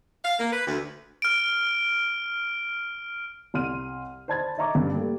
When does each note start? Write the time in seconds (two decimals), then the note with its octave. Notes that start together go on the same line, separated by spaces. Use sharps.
0.24 F5
0.40 A#3
0.53 B4
0.66 D2
1.22 F6 D7
3.54 C2 C6 F6 D#7
4.28 C5 D5 A5 B5 G#6 A6
4.58 C#5 D#5 E5 A#5 C#6 D6
4.75 G2 C#3
4.93 G3 A3 A#3 G4